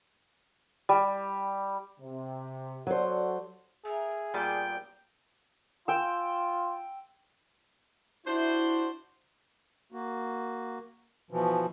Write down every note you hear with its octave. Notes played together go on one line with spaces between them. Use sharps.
G3
C3
F#3 F#4 A4 C5 D5
A3 G#4 A#4
A#2 G3 B3 G5 C6 D6
F4 G5 E6
D4 E4 F#4 C5
A#3 F#4
B2 E3 F3